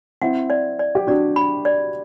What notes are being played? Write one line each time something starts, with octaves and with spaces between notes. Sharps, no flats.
C4 E4 F#5
D5
D5
G4
D4 F#4 D5
B5
D5